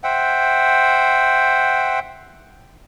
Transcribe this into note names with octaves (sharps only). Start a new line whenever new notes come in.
C5 E5 F#5 G5